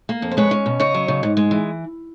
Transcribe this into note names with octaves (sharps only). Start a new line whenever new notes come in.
A#3
F2
C5
G#3 B4 C#5
C#4
B2
C#3 C#5 D#5
F#3
C#3
G#2
G#3
E3